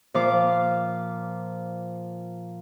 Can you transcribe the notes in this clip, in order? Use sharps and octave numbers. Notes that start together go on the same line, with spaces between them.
A#2 F3 F5 D6